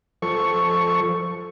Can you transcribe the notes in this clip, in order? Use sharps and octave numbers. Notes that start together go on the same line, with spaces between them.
F3 A4 C#6